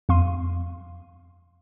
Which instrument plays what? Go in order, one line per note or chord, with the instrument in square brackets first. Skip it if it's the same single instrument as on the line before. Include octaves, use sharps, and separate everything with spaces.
[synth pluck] F2 F5 C6 D#7